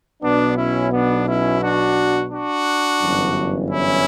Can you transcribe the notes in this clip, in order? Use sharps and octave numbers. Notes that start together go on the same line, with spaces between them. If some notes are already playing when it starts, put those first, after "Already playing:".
B1 B2 B3 D4
C#4 E4
B3 D4
C#4 E4
D4 F#4
D4 F#4
G1 F#2 E3
C#4 E4